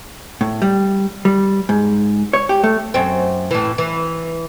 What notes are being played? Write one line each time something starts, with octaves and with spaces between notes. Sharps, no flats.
A2
G3
G3
G#2
C#5
G4
A3
F#2 C4
A2 E3
E3